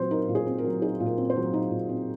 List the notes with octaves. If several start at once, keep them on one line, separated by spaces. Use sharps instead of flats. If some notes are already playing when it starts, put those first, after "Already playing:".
Already playing: A#2 F#3 C4 C5
D#4 A#4
A#2
G#4
C4
A#4
F#3
D#4 G#4
A#2
A#4
C4
C5
F#3
D#4
A#2
C4